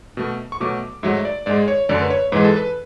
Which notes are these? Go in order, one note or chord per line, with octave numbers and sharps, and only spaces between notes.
B2 A3
C#6
B2 F#3 A3 D6
G#2 F#3 A3 E5
D5
G#2 G#3 D5
C#5
F#2 D3 A3 D5
B4
C#5
G#2 E3 G#3 B4
A4
B4